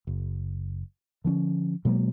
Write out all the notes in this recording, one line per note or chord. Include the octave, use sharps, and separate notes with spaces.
F#1
D3 F3 C4 C#4
B2 F#3 G#3 A#3